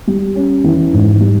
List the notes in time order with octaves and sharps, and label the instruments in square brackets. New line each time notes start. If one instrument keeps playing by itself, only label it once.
[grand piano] G3
C#4
E3
G#2
G3